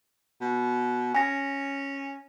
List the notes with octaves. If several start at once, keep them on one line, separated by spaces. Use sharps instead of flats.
B2
C#4 G#5 A#6